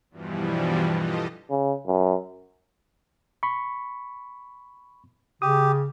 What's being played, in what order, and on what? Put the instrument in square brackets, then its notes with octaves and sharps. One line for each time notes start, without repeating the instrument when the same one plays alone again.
[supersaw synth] E2 G2 B2 E3 F3 G3
F4 G4 A4 D#5
[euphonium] C#3
F#2
[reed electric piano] B5 C#6
[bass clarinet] C#3 [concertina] G4 [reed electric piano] D#6